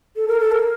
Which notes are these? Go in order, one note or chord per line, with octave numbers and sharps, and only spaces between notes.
A4
A#4
A4
A#4